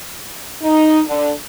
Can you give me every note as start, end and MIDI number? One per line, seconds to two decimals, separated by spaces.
0.63 1.00 63
1.07 1.31 50